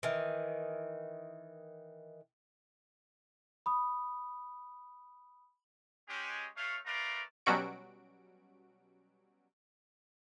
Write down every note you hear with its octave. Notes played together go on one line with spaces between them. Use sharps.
D#3 E3
B5 D#6
G#3 C#4 G4
A3 C#5 F5
A3 A#4 B4 D5 F5 A#5
B2 F#3 G3 C#4 F#4 D7